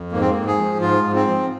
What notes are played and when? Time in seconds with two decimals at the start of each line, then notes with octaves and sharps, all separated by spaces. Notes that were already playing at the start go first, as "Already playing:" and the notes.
Already playing: F2
0.12 G#2 A#3
0.21 C4
0.29 A#3
0.36 G#2
0.47 G#4
0.57 F3
0.81 G#2 F4
1.04 G#2
1.15 C4
1.27 F3